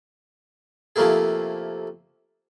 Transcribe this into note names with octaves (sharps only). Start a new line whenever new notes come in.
C3 F3 A3 A#3 E4 G#4